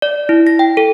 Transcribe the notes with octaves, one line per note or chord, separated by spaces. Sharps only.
D5
E4
A#6
G5
A4